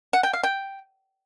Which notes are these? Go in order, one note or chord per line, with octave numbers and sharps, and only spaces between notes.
F#5
G5
F5
G5